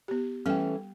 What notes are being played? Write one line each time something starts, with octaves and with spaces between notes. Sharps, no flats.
B3 G4
E3 G3 A3 C#4 G5